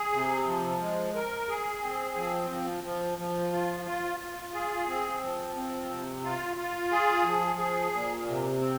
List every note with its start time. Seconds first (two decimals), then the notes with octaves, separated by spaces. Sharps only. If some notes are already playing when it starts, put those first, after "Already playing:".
Already playing: G#4
0.13 C3
0.47 F3
0.80 G#3
1.15 A#4
1.48 G#4
1.82 C4
2.16 F3
2.50 F3
2.84 F3
3.18 F3
3.52 F4
3.85 F4
4.20 F4
4.54 G#4
4.88 C4
5.21 F3
5.56 C4
5.90 C3
6.24 F4
6.57 F4
6.91 G#4
7.25 F3
7.58 G#4
7.93 A#2
8.26 C3
8.60 C4